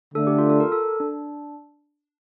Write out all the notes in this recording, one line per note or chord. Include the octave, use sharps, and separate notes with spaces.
D3 A3 D4 A4
G4
F4
A4
A#4
A4
D4